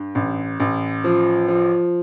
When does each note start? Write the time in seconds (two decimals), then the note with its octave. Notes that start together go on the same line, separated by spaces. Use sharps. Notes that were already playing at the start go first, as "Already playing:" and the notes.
Already playing: G2
0.15 A1
0.60 A1
1.04 F3
1.48 F3